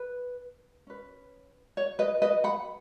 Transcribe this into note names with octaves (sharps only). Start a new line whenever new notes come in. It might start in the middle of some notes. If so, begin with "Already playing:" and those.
Already playing: B4
C#4 B4
C#5
B4 D#5
B4 D#5
F#5 B5